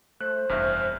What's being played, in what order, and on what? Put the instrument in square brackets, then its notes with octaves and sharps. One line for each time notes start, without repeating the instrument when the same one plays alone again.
[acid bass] A3 [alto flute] C5 [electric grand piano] F#6
[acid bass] F1 [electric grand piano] E2 G2 [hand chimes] E5 F6 F#6